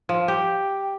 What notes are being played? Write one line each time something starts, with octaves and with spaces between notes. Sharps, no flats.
F3
G4 G5